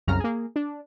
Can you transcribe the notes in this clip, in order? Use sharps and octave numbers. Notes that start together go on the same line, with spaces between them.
C2 F#2 C#3 A#5 F6
A#3 G#4
D4